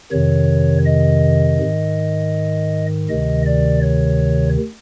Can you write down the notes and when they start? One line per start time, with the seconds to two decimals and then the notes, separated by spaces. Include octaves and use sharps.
0.12 F2 C3 D#3 C#5
0.85 D#5
1.60 G#2 D#3
3.09 D2 C3 D#3 D#5
3.46 D5
3.82 C#5